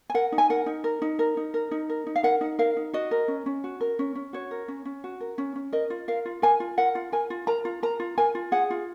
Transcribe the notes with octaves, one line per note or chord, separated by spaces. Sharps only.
G#5
A#4 F#5
D#4
G#5
A#4 F#5
D#4
A#4
D#4
A#4
D#4
A#4
D#4
A#4
D#4
F5
A#4 F#5
D#4
A#4 F5
D#4
F#4 D#5
A#4
C#4
C#4
F#4
A#4
C#4
C#4
F#4 C#5
A#4
C#4
C#4
F#4
A#4
C#4
C#4
A#4 D#5
F4
A#4 F5
F4
A#4 G#5
F4
A#4 F#5
F4
A#4 G#5
F4
A#4 A#5
F4
A#4 A#5
F4
A#4 G#5
F4
G#4 F#5
F4